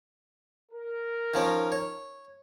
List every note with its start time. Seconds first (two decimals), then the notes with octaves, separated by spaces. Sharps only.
0.72 A#4
1.34 D#3 F3 C#4
1.72 C#5